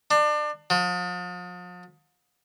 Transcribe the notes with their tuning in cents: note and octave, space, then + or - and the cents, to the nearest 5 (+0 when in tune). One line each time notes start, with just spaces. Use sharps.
D4 +30
F3 +40